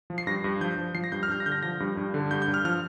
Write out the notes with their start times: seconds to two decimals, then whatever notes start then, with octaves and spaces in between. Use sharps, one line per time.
0.10 F3
0.18 C7
0.27 G2 A#6
0.44 G2
0.61 F3 G6
0.78 F3
0.95 F3 C7
1.04 A#6
1.12 G2 G6
1.23 F6
1.29 G2 G6
1.40 A#6
1.46 D3 G6
1.52 A#6
1.63 F3 A#6
1.80 G2
1.97 G2
2.14 D3
2.31 G2 G6
2.42 G6
2.48 G2
2.54 F6
2.65 F3 F6